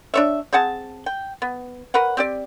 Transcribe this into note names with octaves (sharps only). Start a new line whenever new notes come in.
D4 C#5 E5
C4 G#4 F#5 A5
G5
B3
A#4 B4 C#5 F#5
C4 G4 D5